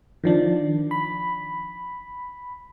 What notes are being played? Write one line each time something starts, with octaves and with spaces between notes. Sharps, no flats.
D#3 F3 D4
B5